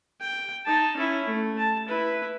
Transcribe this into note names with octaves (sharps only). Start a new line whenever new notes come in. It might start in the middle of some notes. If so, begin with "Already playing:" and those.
G5
D#4 A5
C#4 E4
A3
A5
E4 B4